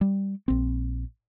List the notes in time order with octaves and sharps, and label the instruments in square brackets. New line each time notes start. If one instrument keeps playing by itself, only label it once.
[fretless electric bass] G3
A#1 C4